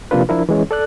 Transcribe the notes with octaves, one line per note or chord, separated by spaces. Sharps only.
C3 F3 A#3 D4 F4 B4
F3 D4 E4 A#4
E3 G#3 C#4
A4 D5 F#6